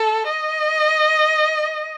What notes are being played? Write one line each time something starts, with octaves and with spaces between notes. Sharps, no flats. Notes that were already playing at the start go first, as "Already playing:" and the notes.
Already playing: A4
D#5